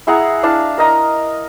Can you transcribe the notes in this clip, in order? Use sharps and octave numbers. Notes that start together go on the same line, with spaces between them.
E4 G#4 F#5 A#5
D4 E4 F5 A5
A#4 D#5 A#5